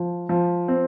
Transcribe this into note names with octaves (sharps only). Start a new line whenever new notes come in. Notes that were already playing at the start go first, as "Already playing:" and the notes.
Already playing: F3
F3
C4